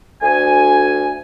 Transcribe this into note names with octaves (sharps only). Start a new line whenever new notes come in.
D2 G#5